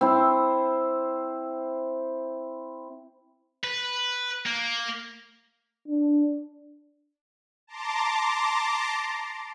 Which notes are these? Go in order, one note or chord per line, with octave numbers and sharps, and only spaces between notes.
C4 E4
B4
A#3
D4
A5 A#5 C6 D6